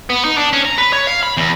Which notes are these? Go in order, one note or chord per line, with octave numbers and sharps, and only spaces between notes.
B3
D#4
D4
C#4
A#5
B4
C#5
F5
B5
E2